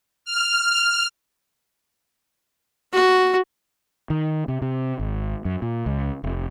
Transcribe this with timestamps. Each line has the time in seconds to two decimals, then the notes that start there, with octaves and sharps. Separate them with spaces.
0.25 F6
2.93 F#4
4.10 D#3
4.48 C3
4.62 C3
4.99 G#1
5.45 F#2
5.62 A#2
5.86 C#2
6.24 F1